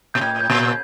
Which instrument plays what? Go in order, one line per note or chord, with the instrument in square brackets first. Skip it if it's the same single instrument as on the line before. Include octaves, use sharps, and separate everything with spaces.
[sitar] A#2 [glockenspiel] G6
[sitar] A2 [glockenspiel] G#6
[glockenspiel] G6
[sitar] A#2
[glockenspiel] G6